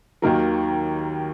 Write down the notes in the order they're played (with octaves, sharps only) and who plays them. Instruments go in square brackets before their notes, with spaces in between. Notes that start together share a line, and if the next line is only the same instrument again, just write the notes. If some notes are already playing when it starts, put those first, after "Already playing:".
[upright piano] D#2 D#3 F#3 A#3 A#4